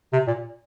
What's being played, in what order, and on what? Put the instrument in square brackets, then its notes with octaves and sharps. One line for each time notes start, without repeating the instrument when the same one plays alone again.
[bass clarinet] C3
A#2